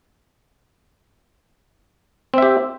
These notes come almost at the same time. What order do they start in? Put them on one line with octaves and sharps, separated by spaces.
C4 E5 G4